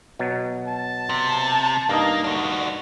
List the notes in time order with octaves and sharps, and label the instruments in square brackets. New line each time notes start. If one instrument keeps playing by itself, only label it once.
[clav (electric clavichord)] B2 F#3
[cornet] A5
[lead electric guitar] C3
[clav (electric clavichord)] G2 D#4 [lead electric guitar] A#3
[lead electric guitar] D4 F#4